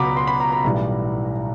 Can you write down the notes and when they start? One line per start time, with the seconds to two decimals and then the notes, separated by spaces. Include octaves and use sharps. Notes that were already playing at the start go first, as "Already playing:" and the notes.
Already playing: C#2 B2 F#3 A#5 B5 D6
0.17 C6
0.27 B5
0.40 A#5
0.52 A#5
0.64 B1 A2 E3 G3